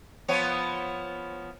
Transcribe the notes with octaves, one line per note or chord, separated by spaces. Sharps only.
F3 B3 C#5